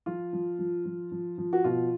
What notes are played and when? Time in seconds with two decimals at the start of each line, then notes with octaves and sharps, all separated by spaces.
0.06 F3 F4
0.33 F3
0.59 F3
0.85 F3
1.12 F3
1.38 F3
1.53 F#4
1.64 B2 F4